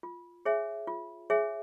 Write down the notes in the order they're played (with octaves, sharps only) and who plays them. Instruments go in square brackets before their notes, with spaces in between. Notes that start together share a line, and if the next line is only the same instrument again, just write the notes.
[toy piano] F4
G#4 C#5 E5 G#5
F4
G#4 C#5 E5 G#5